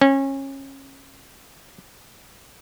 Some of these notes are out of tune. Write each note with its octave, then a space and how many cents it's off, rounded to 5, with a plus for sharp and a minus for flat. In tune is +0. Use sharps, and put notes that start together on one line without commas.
C#4 -25